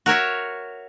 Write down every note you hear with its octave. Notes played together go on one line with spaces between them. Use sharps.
F#4 A#4 C#5 E5